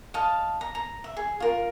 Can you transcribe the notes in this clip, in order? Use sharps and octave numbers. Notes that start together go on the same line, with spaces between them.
D#5 F5 A5
A#5
A#5
E5
G#4
F4 A#4